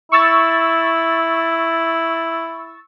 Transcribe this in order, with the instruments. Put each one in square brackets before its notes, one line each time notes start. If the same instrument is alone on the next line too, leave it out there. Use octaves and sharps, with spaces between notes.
[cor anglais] E4 [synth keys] C#6 E6 A6